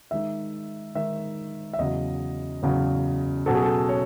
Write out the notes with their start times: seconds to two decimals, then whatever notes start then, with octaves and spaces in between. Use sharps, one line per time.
0.11 D#3 G#3 D#4 E5
0.95 D#3 G#3 D#4 E5
1.73 E5
1.79 E2 C#3 F#3 D#5
2.62 E2 C#3 F#3
3.46 B2 F#3 C#4 A4
3.55 G#4
3.64 A4
3.89 C#5